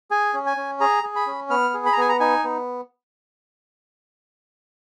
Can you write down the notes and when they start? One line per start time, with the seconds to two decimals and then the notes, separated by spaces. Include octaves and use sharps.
0.11 G#4 G#5
0.33 C#4
0.46 G#5
0.57 C#4
0.80 G#4 A#5
1.03 G#4
1.16 B5
1.27 C#4
1.50 B3 F6
1.74 G#4
1.86 B5
1.93 A#5
1.97 B3 G#5
2.09 A#5
2.20 D#4 G#5
2.44 B3